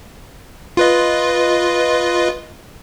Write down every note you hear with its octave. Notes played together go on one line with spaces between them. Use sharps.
F4 B4 D#5